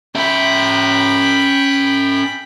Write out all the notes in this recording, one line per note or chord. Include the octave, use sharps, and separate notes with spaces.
C#4 E5 G5 B5